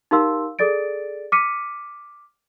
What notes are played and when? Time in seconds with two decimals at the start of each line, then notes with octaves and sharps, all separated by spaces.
0.11 D#4 G4 A#4 F5 C6 E6
0.59 G#4 A4 D5 A6 D7
1.32 D6 F6 B6 C#7 D#7